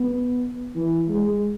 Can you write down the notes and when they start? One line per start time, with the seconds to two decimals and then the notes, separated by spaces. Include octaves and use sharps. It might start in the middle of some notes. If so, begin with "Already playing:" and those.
Already playing: B3
0.75 E3
1.08 G#3